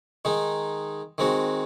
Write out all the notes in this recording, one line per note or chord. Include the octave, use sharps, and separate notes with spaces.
D#3 G#3 D#4
D#3 G#3 C4 F#4